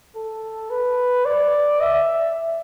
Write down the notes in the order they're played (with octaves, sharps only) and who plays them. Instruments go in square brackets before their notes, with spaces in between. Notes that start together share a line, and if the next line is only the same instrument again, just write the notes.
[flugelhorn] A4
B4
D5
E5